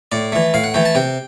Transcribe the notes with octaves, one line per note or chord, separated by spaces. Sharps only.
A2 D5
E3 A3
A2 F5
F#5
E3 A3 G5
A5
C3 G5